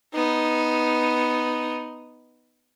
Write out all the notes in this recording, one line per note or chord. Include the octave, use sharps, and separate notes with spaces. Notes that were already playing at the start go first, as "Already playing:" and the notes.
B3 D#4